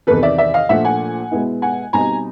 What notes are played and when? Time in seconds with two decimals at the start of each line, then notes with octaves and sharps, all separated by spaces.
0.07 E2 C3 D#3 A4 B4
0.23 D5 E5
0.38 D5 E5
0.54 D#5 F5
0.69 A#2 F3 A3 D4 E5 F#5
0.84 F#5 G#5
1.31 B2 G#3 B3 E4
1.62 F#5 G#5
1.93 B2 G3 C4 D#4 G#5 A#5